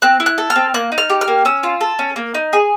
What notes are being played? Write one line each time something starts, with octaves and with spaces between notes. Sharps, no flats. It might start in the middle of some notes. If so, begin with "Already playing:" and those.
C4 F#6
E4
F#6
A4
F6
C4
A#3 F#6
D#4
F6
G4
F6
A#3
C#4 E6
F4
A4
C#4
A#3
D#4
G#4